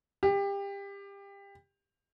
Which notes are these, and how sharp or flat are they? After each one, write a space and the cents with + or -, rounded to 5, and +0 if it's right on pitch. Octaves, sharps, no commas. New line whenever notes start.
G4 +25